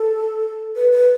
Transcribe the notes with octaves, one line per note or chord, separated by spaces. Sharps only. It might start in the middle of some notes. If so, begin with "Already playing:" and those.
Already playing: A4
B4
B4